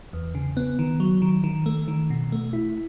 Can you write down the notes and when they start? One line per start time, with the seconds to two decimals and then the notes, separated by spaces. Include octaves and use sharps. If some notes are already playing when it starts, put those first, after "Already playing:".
0.13 E2
0.35 C#3
0.57 B3
0.79 D#3
1.00 F#3
1.22 D#3
1.44 D#3
1.66 A3
1.88 D#3
2.10 B2
2.32 A3
2.53 E4